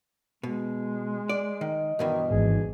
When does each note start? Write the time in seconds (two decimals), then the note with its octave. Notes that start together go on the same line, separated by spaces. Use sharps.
0.43 B2 G#3
1.29 D5
1.61 D#3 D#5
1.99 G2 B2 D#3 E3
2.30 G#1 E2 G#2 G#4